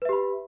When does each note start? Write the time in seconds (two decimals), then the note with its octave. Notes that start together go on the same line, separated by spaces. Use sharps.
0.02 B4
0.05 E5
0.09 G4
0.13 B5